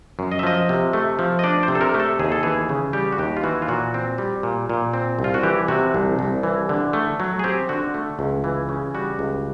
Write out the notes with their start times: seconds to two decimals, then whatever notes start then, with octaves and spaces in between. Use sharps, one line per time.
0.19 F#2
0.32 D#5
0.39 E5
0.43 F3 D#5
0.69 C3
0.93 A3
1.19 F3
1.39 D#5
1.44 D4 D5
1.63 C5
1.68 C3
1.75 A4
1.81 A#4
1.94 A3
2.00 A4
2.19 D#2 G#4
2.32 A4
2.43 E3 G#4
2.69 C#3
2.93 G3 G4
3.12 F#4
3.18 D#2 G4
3.37 F4
3.43 E3 F#4
3.62 F4
3.68 A#2 F#4
3.94 C4
4.18 G3
4.43 A#2
4.70 A#2
4.94 C4
5.19 C2
5.24 F4
5.34 F#4
5.43 E3 G4
5.68 C3 F#4
5.94 C2
6.19 C2
6.43 E3
6.69 D3
6.93 A3
7.20 F#3
7.39 G#4
7.44 C4 G4
7.69 D3 F#4
7.94 A3
8.19 C#2
8.44 E3
8.69 C#3
8.95 G3 F#4
9.19 C#2